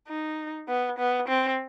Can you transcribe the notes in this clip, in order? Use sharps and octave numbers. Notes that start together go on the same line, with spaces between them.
D#4
B3
B3
C4